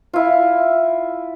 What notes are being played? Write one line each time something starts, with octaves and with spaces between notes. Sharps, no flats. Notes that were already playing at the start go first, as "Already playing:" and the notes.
E4 F4